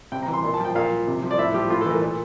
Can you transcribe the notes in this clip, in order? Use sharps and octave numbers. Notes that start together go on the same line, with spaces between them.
C3 G5
A#5
E3
C6
A#2 C6
A5
F3 G5
A#2 F5
F3
C3
F3
D5
A2 E5
F3 G4
A2 F4
A4
E3 A#4
A#2